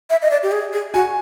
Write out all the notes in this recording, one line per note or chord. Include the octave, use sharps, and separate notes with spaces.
E5
D#5
D5
G4
G#4
G#4
F#4 G#5